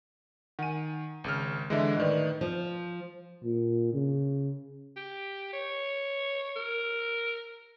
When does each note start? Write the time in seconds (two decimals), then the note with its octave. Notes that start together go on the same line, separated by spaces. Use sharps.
0.59 D#3 F#5 G#5 D#7
1.24 G#1 C#3 F6
1.70 D3 E3 G#3 D#5 E5
1.97 A2 D#3 B4 D5 D#5
2.41 F3
3.43 A#2
3.93 C#3
4.97 G4
5.53 C#5
6.56 A#4